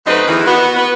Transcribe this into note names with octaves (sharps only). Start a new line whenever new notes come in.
F#2 A3 C4 D#4 B4 D#5
E2 D#3 E3
B3 F#4
B3 B4